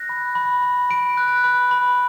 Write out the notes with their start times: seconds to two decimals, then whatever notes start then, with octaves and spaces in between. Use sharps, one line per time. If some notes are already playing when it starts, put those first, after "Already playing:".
Already playing: F#6 A#6
0.09 B5
0.35 B5
0.62 B5
0.90 B5 D7
1.17 F#6
1.44 B5
1.71 B5